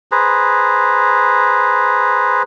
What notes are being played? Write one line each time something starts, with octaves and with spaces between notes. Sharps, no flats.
G#4 B4 C5 A#5